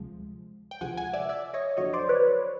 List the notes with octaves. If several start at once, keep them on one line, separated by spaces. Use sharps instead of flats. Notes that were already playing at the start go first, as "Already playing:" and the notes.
Already playing: D2 C3 F3 G#3
G5
D2 C3 F3 G#3 F#5 G#5
F#5 G#5
D5 E5
D5 E5
C#5 D#5
F2 D3 F#3 C#5 D#5
C5 D5
B4 C#5